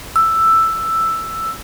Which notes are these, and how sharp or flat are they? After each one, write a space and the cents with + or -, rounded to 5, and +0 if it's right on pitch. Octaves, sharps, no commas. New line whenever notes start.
E6 +5